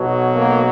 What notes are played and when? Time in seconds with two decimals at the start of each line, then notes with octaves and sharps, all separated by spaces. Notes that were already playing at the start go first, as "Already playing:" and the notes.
Already playing: B1 B2 F#3
0.32 A#3